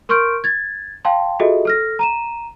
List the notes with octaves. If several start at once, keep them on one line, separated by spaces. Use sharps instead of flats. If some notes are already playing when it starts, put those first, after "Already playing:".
A#4 C6 C#6 F6 G6 D7
G#6 A6
F5 G5 A5 C6
F4 F#4 G#4 A4 D#5 E5
A4 F6 A#6
A#5 D#7 E7